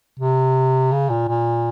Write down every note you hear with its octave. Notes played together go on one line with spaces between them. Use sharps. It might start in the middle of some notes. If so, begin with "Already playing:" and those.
C3
C#3
A#2
A#2